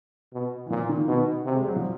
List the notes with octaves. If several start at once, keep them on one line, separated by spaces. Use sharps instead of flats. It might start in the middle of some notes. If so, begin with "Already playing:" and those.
B2
E3
A#2 F3
D#3
B2 D#3
C3
G#3
G3
F#3
F3